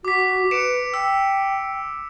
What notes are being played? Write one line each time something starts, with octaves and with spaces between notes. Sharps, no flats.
F#4 D6 B6
B4 C#7 D7 E7
G5 E6